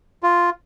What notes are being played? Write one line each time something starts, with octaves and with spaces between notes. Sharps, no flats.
F4